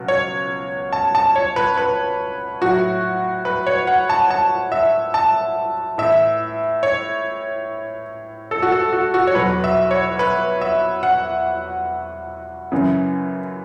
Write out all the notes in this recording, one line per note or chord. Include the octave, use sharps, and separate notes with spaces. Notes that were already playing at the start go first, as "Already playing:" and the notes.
Already playing: C#2 B2 F#3
C#5
A5
A5
C#5
B4
B4
A2 F#3 F#4
B4
C#5
F#5
A5
A5
E5
A5
A2 E3 E5
C#5
A4
F#4
A4
F#4
F#4
C#5
E2 B2 F#3 B4
E5
C#5
B4
E5
F#5
F#2 C#3 E3